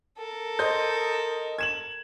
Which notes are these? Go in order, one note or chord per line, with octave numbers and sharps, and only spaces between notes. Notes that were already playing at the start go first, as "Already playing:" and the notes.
A4 A#4
C5 D#5 G6
G#6 E7 F#7